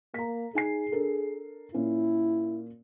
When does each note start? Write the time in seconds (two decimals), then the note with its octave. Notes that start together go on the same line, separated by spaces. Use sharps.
0.14 A#3 A#5 B6
0.55 D#4 G#4 G#5 C7
0.92 D4 A4 A#4
1.74 A#2 C#4 E4